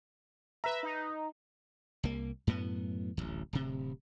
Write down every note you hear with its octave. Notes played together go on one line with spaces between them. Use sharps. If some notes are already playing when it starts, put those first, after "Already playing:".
B4 E5 A#5
D#4
C2 A#3
F#2 A2 B3
D1 A1 D#2
D1 C3